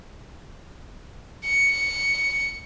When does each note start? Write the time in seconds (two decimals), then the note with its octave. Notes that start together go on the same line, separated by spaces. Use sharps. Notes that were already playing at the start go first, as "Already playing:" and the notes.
1.46 C#7